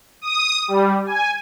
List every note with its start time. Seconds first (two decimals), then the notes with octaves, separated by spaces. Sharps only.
0.21 D#6
0.68 G3
1.06 G#5